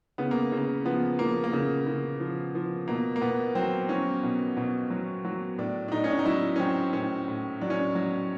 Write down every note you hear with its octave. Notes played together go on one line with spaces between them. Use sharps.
C#3 B3
A#3
C#3 A#3
F3 B3
F3 A#3
A#3
C#3
C#3
F3
F3
B2 A#3
A#3
B2 B3
F#3 C4
F#3 C#4
B2
B2
F#3
F#3
A2 D4
D4
A2 D#4
C#4
D4
D#4
F#3 E4
C#4
F#3 C4
A2 C#4
A2
F#3 D4
C#4
D4
F#3